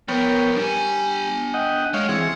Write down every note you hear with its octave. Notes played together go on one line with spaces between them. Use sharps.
F3 B3 A#4 C#5 G5
G3 D4 G#5
D#5 F#5 G5
G#3 C#5 F5
E3 C4 G#4 F#5